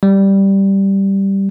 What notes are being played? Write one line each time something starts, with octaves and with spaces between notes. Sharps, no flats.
G3